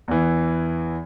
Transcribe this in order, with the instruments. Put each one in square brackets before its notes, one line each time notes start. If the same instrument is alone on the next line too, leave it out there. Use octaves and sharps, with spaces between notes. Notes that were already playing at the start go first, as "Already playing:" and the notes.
[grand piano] E2 E3